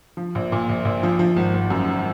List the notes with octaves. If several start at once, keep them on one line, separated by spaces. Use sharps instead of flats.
F3
A#1
A#2
A#1
A#1
F3
F3
G#1
G#1
F#2
G#1